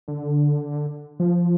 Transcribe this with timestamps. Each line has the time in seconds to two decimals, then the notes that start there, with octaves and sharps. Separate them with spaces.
0.08 D3
1.20 F3